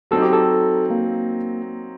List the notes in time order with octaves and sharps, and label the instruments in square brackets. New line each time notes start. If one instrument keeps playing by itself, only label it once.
[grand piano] F#3 C4 D#4 [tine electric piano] A4
[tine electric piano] G4
A4
A#3